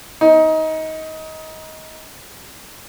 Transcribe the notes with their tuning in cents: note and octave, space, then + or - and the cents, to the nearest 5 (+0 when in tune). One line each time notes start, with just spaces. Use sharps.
D#4 +20